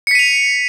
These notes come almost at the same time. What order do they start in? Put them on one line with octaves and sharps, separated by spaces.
C#7 B6 D#7 F7